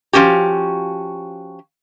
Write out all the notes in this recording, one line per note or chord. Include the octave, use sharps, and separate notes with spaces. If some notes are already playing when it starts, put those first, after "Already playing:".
F3 F#3 C#4 F#4 G4